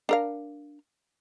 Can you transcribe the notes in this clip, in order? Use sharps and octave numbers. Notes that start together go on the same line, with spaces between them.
D4 A#4 F5